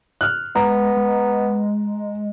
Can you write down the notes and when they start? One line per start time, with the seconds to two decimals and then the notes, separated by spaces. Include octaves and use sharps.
0.21 F6 F#6
0.56 G#3 B3 A#5
0.97 G#3